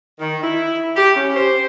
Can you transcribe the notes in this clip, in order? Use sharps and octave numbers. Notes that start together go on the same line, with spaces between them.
D#3
E4
G4
C#4
C5